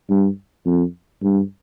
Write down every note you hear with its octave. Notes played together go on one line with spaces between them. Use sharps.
G2
F2
G2